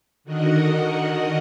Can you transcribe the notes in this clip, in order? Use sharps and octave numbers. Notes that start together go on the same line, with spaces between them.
D3 D#3 F#4 A#4 D#5 F#5